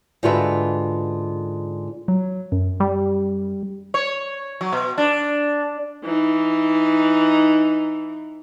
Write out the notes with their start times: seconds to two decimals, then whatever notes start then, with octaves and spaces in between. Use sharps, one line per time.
0.23 G#2 D3 F4 F#4 B4 E5
2.08 F#3
2.52 F#2
2.80 G3
3.94 C#5
4.61 F#3
4.73 B2
4.98 D4
6.04 E3 D#4